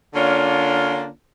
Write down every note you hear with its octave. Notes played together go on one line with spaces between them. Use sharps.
D3 A#3 C#4 D4 F4 C#5